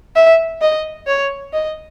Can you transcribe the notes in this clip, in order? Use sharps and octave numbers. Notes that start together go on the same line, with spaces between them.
E5
D#5
C#5
D#5